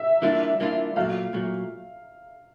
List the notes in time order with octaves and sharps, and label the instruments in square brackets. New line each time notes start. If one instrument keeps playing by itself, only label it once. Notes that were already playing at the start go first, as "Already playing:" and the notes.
Already playing: [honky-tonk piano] E5
[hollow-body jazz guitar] E3 G3 A#3 D4 F4
E3 G3 A#3 D4 F4
[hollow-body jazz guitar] A#2 F#3 A3 [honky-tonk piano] F5
[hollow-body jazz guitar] A#2 F#3 A3